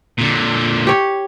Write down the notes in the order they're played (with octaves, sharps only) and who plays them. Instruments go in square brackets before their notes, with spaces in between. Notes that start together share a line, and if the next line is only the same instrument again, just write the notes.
[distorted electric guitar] A#2 D3
[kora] G4 C#5